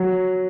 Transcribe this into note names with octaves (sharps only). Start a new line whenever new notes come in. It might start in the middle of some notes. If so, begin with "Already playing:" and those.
Already playing: F#3